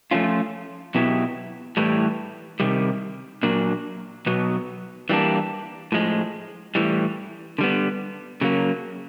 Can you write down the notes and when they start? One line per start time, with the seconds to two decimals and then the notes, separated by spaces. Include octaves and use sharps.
0.11 F3 A3 C#4 F4
0.95 B2 F#3 B3 E4 G4
1.77 A2 E3 G3
2.60 C3 D#3 G3
3.43 A#2 F#3 A#3 D4
4.26 B2 F#3 B3
5.09 E3 G3 A#3 D4
5.92 A2 F3 G#3
6.75 A2 E3 G3
7.58 D3 G3 B3
8.41 C#3 F#3 A#3